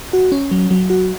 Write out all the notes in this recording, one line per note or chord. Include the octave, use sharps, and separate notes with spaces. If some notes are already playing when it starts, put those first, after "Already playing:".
F#4
C#4
F#3
F#3
F#4